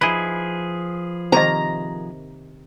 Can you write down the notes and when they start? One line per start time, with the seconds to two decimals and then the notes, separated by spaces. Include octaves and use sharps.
0.01 F3 D#4 E4 G#4 B4 D#5
1.32 C3 D#3 A#3 C5 D#5 A#5